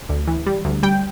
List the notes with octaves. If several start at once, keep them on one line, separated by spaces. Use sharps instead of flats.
D2
E3
G3
D2
G3 G5